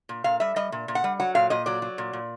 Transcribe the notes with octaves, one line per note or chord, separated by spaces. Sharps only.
A#2
A#2 F5
G3 E5
G3 D#5
A#2
A#2
F#5
G3
F#3 F#5
A#2 F5
A#2 D#5
F#3 D5
F#3
A#2
A#2